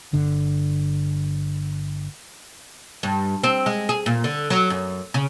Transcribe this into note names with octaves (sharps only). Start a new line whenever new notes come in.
G1 D3
G2
C4
G#3
G#4
A#2
D3
F#3
F#2
C#3